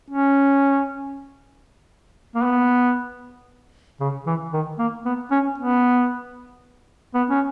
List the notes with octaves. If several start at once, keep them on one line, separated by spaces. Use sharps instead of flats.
C#4
A#3
B3
C#3
E3
D#3
A#3
B3
C#4
B3
B3
C#4